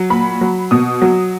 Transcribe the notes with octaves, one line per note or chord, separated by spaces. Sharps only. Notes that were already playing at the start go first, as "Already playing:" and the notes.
Already playing: F#3
A#2 B5
F#3
B2 D#6
F#3